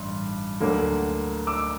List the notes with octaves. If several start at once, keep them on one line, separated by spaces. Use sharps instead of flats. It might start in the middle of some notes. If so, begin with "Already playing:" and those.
Already playing: A1 G2 C6
D2 D3 F#3 A#3
D6 E6